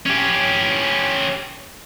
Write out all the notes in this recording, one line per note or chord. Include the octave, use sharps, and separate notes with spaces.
C#4 G4